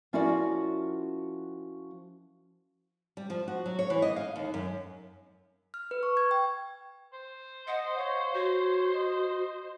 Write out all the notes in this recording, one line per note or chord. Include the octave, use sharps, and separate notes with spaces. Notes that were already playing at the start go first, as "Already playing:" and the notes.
F3 C#4 E4 F#4 A#4 D5
G3
F3
F#4
F#3
C#5
E3
D#5
F5
D#2
F#2
F6
B4
C#6
G#6
G5
C5
D#5 F#5
C#5 F5
F#4 C#5
D#5